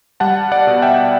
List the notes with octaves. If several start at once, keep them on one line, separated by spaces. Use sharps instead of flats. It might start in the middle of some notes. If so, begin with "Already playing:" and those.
G3 F#5 A5
D5 F#5
B2
E5 G5